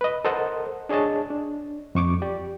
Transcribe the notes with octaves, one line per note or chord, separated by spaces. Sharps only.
B4 D#5
A4 A#4 C5 D#5 F#5 A5
D4 G#4 C#5 D#5 A5
D4
F2 C#6 D6
G4 D5